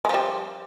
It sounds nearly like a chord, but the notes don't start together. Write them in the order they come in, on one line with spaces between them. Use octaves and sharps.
G#3 F3 G3